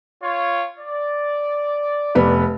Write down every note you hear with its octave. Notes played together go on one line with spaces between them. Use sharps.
F4 C#5
D5
F1 B3 B5